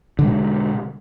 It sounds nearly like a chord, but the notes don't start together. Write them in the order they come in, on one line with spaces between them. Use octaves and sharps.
D3 G#3 B2